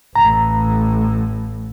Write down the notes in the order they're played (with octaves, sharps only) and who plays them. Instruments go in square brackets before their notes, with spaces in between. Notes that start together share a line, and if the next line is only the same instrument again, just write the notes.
[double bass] A1 A2 [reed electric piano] A#5